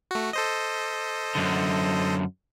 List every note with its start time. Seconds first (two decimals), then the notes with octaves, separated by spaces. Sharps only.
0.11 A3 F#4
0.33 A4 C5 D#5
1.35 F#2 D3